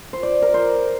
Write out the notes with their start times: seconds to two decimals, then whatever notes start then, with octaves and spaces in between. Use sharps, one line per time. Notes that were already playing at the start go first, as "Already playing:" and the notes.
0.13 C5
0.23 D5
0.42 A#4
0.54 C5